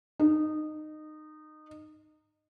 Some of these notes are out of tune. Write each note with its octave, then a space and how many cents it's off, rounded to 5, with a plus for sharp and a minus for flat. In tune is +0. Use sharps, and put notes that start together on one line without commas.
D#4 -20